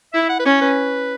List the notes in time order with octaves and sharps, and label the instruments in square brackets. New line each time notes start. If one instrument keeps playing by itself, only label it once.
[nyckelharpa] E4 [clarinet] E5
[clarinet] F#5
B4
[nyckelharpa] C#4 [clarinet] C#5
[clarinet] B4